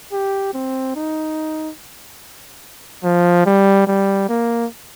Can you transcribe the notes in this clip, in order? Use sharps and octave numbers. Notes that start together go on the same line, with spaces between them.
G4
C4
D#4
F3
G3
G3
A#3